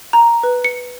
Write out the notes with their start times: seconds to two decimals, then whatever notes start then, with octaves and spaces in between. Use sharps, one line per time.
0.13 A#5
0.43 B4
0.64 C#7